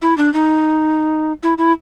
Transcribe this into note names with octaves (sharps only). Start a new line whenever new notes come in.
E4
D4
D#4
E4
E4